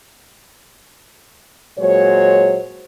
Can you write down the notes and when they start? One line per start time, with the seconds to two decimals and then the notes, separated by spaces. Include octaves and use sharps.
1.78 A#2 F#3 G#3 C5 C#5